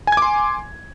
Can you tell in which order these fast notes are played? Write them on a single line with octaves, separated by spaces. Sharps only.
G#5 G#6 D6 C6